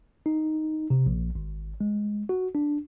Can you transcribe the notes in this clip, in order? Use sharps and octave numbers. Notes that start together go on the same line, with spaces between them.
D#4
C3
A#1
G#1
G#3
F#4
D4